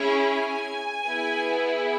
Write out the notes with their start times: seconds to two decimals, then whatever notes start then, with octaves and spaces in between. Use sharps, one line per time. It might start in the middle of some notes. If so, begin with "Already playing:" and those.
Already playing: C#4 E4 G#4
0.19 G#5
1.05 B3 E4 G#4